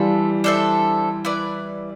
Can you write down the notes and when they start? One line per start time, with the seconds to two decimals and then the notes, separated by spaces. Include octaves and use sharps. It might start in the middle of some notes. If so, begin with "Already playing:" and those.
Already playing: E3 G3 D4 F4 A4 E5
0.44 D4 A4 C5 E5
1.25 E4 B4 D5